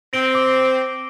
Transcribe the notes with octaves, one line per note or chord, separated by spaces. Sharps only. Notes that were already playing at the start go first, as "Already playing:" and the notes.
C4 A#6 D7 G7
D6